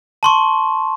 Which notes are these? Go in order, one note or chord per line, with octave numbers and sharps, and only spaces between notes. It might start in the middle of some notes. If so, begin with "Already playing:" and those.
A5 C6 C#6